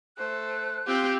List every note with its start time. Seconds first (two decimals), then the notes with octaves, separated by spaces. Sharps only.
0.18 A3 C5 F#6
0.87 C4 F4 G4